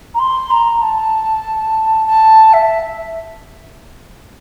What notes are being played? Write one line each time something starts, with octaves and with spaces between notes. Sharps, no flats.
A#5
C6
A#5
A5
A5
E5